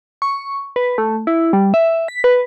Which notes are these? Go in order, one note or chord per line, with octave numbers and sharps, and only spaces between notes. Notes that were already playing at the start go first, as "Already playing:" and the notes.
C#6
B4
A3
E4
G3
E5
B6
B4